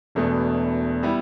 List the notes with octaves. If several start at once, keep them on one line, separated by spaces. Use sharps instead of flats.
E1 E2 B2 A3
G3 B3 E4